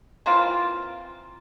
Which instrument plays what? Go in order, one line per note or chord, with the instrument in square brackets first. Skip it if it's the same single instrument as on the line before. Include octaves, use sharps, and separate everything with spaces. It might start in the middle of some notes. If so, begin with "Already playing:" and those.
[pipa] E3 A#3 C4 F4